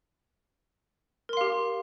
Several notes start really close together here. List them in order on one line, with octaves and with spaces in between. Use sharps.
A#4 C6 F5 G4